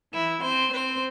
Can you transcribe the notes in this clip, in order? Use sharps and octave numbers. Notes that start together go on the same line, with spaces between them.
E3 E4
C4 C5
C4 C5